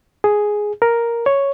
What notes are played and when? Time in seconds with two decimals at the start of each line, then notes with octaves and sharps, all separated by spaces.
0.24 G#4
0.82 A#4
1.26 C#5